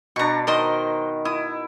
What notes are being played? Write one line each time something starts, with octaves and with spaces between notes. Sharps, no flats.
B2 D4 A#5 C#6
D#3 A#4 C5 D#5
E4 D#6